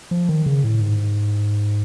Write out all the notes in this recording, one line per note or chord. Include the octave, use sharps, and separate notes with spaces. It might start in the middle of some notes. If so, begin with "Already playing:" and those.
F3
D#3
C#3
A2
G#2